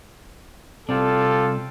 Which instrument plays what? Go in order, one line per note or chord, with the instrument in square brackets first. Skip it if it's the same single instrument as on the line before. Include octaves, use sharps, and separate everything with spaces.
[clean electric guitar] C2 C4 D5 [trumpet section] F4 G4 A4